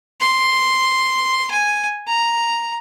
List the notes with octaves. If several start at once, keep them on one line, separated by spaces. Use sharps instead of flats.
C6
G#5
A#5